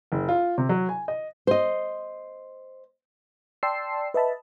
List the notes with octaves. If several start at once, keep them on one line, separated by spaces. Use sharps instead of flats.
F#1
F4
C3
F#3
G#5
D#5
C5 D#5
D5 G5 A5 C6 E6 C7
B4 D#5 E5 A5 B5